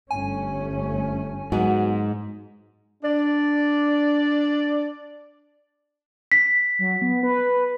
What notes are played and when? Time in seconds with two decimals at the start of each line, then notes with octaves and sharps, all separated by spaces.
0.11 G1 A3 C#4 G#5
1.52 G#2 F#3 B3 F#4
3.03 D4 D5
6.32 B6
6.79 F#3
7.02 B3
7.23 B4